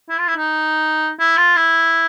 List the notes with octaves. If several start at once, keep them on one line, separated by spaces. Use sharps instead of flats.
E4
F4
E4
D#4
E4
F4
E4